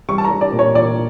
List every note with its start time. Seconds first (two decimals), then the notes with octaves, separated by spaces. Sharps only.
0.09 G3 C#6
0.18 A5
0.25 A#5
0.30 G3
0.41 D5
0.52 A#2
0.59 C#5
0.75 A#2 D5